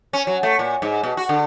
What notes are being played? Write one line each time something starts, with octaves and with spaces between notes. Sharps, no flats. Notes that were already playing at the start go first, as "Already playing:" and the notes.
C#4
F#3
A3
A#2
G#2
B2
F#4
D3